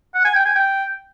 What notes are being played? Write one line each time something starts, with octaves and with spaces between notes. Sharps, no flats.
F#5
G#5
G5
G#5
G5